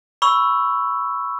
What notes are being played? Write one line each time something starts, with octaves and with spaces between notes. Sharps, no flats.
B5 C#6 E6